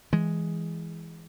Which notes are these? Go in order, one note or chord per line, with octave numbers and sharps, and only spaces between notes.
E3 G#3